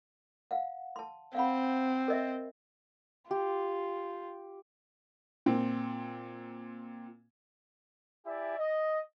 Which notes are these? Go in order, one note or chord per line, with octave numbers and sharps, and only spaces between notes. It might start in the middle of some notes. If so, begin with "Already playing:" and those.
F5 F#5
A5 C6
C4 F5 F#5 B5
A#4 D#5 E5
F4 G4
A#2 C4
E4 G4 D5 E5 G#5
D#5